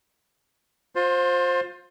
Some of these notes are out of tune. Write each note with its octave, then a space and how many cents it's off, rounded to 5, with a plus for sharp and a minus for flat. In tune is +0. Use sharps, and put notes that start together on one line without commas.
F4 +30 C5 +10